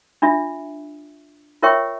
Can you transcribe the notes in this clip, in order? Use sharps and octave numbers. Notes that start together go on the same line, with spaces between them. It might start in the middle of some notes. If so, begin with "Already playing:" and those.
D4 F4 E5
F4 A#4 C#5 E5 G5 C#6